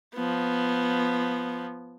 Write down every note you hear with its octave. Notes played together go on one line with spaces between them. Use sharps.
F3 B3